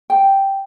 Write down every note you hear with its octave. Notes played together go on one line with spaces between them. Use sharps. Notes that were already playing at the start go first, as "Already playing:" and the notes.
G5